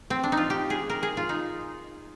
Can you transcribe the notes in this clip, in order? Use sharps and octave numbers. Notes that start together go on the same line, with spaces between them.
C4
D4
D#4
F4
G4
G#4
A#4
G#4
F4
D#4